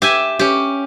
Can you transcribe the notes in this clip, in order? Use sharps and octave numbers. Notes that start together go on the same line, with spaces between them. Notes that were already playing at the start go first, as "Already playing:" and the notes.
G4 E5 G#5
C#4 G4